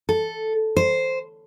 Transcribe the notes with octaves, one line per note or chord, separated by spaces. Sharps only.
A4
C5